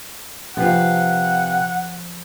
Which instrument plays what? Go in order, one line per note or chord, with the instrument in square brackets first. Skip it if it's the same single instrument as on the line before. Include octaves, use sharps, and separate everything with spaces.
[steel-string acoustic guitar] C3 B4 F5 [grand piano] F3 [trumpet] F#5